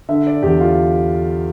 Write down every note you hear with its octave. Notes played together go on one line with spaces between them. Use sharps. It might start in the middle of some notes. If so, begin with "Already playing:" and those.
D3 E5
D5
E2 G4
F4